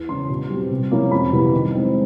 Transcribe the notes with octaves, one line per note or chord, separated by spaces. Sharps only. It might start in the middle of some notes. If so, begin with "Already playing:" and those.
Already playing: E2
C#3 E3 C6
B2
G3
C4
C3
F3 A#3 C#4 E4
F2 B5
C3 E3 G3 B3
D#3
G#3 C4 D#4